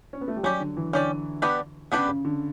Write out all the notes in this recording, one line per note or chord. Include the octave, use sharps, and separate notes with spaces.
C#4
B3
A3
G3
F#3 C#4 G4 D5
D3
E3
D3 C#4 G4 D5
B3 D4 G4 B4 D5
C#3 B3 D4 G4 B4 D5
C#3
D3